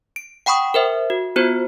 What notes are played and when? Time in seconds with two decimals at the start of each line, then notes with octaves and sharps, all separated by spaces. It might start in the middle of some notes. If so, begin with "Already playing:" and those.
0.16 D7
0.46 F#5 G5 B5 C#6 D#6
0.74 A#4 C5 E5
1.10 F#4
1.36 B3 F4 F#4 C5